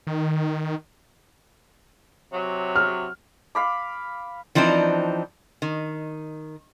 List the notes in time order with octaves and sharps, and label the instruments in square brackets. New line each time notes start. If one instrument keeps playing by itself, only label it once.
[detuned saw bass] D#3
[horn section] C3 F#3
[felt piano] F6
[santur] F5 B5 D6
[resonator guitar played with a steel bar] E3 F3 C4 D4 D#4
D#3